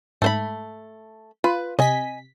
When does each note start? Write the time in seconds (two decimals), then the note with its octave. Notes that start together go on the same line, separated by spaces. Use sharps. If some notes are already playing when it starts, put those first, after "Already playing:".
0.22 G#2 A3 C5 B5
1.44 F4 B4
1.79 C3 D#5 G#5 B6